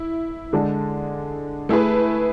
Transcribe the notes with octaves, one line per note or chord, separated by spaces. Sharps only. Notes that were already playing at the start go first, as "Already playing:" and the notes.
Already playing: E4
D3 G#3 D4 A4
A3 E4 G#4 B4